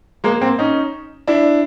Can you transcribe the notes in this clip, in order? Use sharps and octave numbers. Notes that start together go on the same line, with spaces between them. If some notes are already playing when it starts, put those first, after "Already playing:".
G#3 A#3
A#3 C4
C#4 D#4
D4 E4